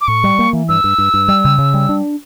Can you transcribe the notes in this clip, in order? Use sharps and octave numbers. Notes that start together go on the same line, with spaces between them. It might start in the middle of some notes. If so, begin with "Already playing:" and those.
D6
A2 C#6
G3
A#3
E3
G2 E6
G2
G2
G2
G3
C#3
C#3
G3
D4